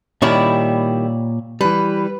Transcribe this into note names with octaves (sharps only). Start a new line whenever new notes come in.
A#2 D#3 G3 E4 C#5 D5
E3 G3 B4